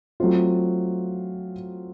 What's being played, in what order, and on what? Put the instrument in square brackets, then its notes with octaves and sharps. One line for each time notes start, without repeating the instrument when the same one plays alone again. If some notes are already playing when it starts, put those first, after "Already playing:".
[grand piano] F#3 A3 C4 F4